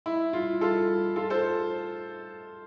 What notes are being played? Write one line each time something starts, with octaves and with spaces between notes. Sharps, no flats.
E4
F4
F4 A4
F4 A4
A4 C5